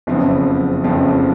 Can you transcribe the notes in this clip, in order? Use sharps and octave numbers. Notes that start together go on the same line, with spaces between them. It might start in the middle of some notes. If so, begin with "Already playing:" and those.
F#1 F2 C#3 F3 B3
F#1 F2 C#3 F3 B3